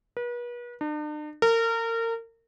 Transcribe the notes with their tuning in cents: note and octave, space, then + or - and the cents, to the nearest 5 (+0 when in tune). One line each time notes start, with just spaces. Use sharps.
B4 -40
D4 +45
A#4 -30